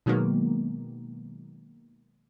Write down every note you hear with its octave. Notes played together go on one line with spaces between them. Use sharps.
B2 D#3 F#3 G#3 A#3 B3